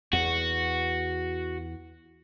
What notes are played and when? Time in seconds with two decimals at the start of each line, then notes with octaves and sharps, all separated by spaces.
0.13 E2 F#4